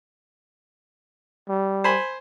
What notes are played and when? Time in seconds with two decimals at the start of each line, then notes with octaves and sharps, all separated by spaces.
1.49 G3
1.84 C5 G#5 B5